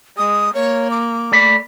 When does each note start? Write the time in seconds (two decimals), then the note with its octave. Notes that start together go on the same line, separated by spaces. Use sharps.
0.17 G#3 D#6
0.55 A#3 C#5
0.91 D6
1.32 A3 D5 B5